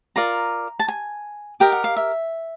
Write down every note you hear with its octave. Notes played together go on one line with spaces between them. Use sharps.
F4 A#4 D5 A#5
A5
G#5
G4 A#4 D#5 G5
F#5
F5
E5